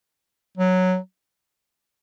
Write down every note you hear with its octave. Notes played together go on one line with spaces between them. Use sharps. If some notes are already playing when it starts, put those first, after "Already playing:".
F#3